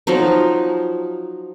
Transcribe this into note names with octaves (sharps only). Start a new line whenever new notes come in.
F3 F#3 D#4